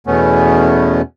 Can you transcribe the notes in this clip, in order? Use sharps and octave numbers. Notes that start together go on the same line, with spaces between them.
E2 B2 A3 B3 C#4